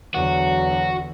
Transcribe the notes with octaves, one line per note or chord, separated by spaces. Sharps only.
E2 D3 F#3 F#4